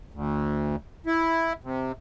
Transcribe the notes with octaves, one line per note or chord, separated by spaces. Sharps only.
D2
E4
C3